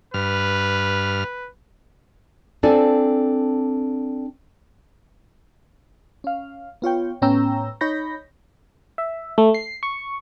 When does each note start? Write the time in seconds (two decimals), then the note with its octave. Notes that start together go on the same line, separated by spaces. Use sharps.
0.14 G2 B4 F6
2.63 C4 D4 F4 A4 D5 G#5
6.24 C#4 F5
6.82 B3 F4 C#5 G5
7.22 A2 B3 C#4 G5 A#5 E6
7.81 D#4 C#5 B5 G6 A#6
8.98 E5
9.38 A3
9.54 C7
9.83 C#6